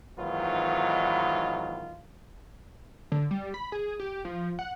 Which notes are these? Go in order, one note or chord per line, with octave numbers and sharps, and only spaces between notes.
G#2 D#3 E3 F#3 B3 F4
D3
G3
B5
G#4
G4
F3
F#5